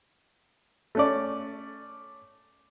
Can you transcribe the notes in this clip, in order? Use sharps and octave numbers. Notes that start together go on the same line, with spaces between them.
A3 C#4 D5